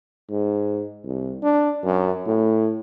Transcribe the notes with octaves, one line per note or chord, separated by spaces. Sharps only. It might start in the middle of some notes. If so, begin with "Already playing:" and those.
G#2
C2
D4
F#2
A2